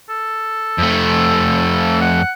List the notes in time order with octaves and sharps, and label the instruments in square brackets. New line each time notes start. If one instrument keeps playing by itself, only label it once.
[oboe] A4
[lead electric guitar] F2 A3
[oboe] F#5